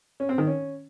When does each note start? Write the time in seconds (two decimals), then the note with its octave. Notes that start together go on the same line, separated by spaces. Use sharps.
0.20 C#4
0.29 C4
0.38 D#3
0.47 C#4